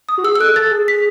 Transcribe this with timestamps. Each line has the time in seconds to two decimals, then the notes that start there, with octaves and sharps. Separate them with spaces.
0.09 D#6
0.18 F#4
0.24 G#4 E6
0.35 E6
0.40 A4 F#6
0.56 A4 A6
0.71 G#4
0.88 B6